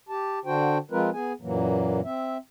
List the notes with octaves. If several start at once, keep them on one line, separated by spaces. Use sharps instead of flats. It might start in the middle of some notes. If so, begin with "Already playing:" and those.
G4 A5
D3 D4 F#4 C5 G5
F3 G#3 C4 F4 A#4 B4
B3 G#4 G#5
F#2 A#2 E3 F#3 A#3
C4 E5